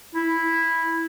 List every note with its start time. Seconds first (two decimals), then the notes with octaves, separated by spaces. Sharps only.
0.15 E4